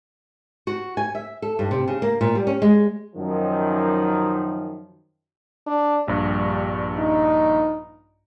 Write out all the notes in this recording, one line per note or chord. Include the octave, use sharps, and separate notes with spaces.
F#4
G#5
E5
A4
G2
C3
C#3
A#3
A#2
G3
C#4
G#3
F#2 D#3 F3
D4
A#1 G2 G3
D#4